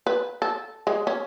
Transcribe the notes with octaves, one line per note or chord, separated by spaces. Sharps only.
B4
A4
G#3
C#4